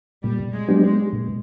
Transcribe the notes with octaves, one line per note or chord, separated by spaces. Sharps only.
A#2 G3
G#3
F#3 B3 D4 G4
G#3
A#2